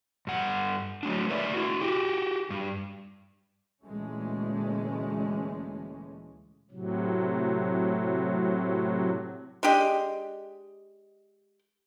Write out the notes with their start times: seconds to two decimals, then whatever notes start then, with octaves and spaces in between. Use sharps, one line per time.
0.27 G2 F#5
1.03 F#3 A3 D4
1.29 A3 A#4 B4 D5 E5
1.53 E4 F#4
1.81 F#4 G4
2.50 G2
3.84 D2 A#2 E3 G#3 A3 C#4
6.71 A2 C3 F#3
9.63 G#3 D4 G4 D#5